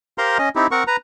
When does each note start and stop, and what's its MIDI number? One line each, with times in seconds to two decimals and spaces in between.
0.18 0.38 67
0.18 0.38 70
0.18 0.38 72
0.18 0.38 77
0.18 0.38 82
0.18 0.38 84
0.38 0.49 61
0.38 0.49 75
0.56 0.67 60
0.56 0.67 63
0.56 0.67 64
0.56 0.67 67
0.71 0.84 60
0.71 0.84 70
0.71 0.84 78
0.71 0.84 85
0.87 0.97 71
0.87 0.97 82